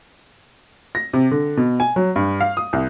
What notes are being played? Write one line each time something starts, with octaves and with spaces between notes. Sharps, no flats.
A#6
C3
D3
B2
G#5
F#3
G2
F5
D#6
C2